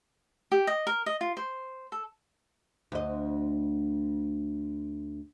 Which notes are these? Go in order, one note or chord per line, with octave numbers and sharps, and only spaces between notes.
G4
D#5
A#4
D#5
F4
C5
A4
D2 D#5